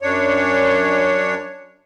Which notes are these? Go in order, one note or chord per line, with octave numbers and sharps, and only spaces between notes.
F#2 D4 C#5